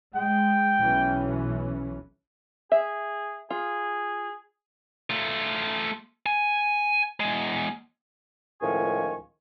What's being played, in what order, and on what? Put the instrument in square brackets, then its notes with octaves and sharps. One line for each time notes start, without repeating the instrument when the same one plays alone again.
[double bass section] G#3 [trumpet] G5
[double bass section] B1 E3 C#4
[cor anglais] G#4 [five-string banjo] E5
[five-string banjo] F4 [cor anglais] G#4
[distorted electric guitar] A3 F4
G#5
E2 G#3
[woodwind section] C#2 A2 D#3 F3 G#5 C#6